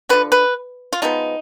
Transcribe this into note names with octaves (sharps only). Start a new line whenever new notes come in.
D3 F3 B3 B4
B4
F4
F3 G#3 B3 D#4